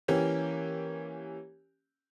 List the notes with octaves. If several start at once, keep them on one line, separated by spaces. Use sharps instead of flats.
E3 A#3 C#4 G4